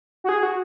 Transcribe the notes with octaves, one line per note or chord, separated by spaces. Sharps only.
F#4
G#4
F#4